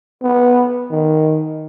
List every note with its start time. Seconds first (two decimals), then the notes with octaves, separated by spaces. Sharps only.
0.23 B3
0.91 D#3